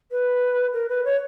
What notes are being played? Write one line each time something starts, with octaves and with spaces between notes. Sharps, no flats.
B4
A#4
B4
C#5